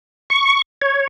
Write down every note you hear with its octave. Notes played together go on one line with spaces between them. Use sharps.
C#6
C#5